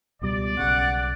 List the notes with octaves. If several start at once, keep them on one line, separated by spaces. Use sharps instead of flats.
C#2 B2 G3 D5
B1 C#3 F#5